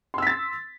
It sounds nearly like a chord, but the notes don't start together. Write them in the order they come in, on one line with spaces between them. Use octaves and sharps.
C6 E6 B6 A6